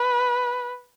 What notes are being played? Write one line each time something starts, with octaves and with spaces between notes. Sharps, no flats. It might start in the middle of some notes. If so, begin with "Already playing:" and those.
Already playing: B4